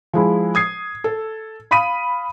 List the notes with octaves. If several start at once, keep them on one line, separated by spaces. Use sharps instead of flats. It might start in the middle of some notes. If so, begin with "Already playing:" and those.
F3 G#3 E4
D#6 G#6 C7
A4
F5 B5 D#6 B6 D#7